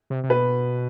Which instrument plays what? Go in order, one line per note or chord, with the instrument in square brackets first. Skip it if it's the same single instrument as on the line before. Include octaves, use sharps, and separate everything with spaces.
[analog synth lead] C3
C3
[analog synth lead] B2 [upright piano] B4